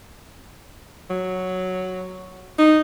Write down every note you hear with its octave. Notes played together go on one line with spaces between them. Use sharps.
F#3
D#4